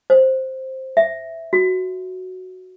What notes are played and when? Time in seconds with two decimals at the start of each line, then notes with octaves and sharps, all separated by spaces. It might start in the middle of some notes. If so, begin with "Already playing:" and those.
0.10 C5
0.97 E5
1.53 F#4